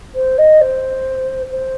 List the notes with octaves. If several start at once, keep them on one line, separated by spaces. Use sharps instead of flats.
C5
D#5
C5
C5